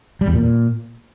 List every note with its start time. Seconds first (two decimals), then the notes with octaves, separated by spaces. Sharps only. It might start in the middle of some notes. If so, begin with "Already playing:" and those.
0.21 G3
0.28 E2
0.34 A#2